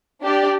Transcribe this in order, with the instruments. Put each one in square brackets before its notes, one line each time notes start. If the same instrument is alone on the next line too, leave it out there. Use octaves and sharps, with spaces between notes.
[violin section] D4 G4 D5